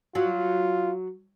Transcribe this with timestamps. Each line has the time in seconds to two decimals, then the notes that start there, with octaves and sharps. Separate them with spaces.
0.15 F#3 F4